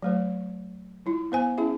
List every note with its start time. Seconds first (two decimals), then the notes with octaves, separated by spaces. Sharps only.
0.02 F#3 A3 C5
1.06 G3 E4 F4
1.32 B3 C5 G#5
1.58 C#4 E4 G#4 E5